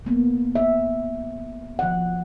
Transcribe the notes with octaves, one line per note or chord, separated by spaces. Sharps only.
B2 A#3 B3
E5
F3 F#5